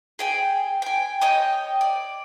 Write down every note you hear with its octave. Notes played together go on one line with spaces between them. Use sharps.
G#4 G5 G#5
G5 G#5
C#5 D#5 G5 D#6
D5